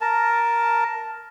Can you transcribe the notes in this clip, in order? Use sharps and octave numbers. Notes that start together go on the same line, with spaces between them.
A#4 A5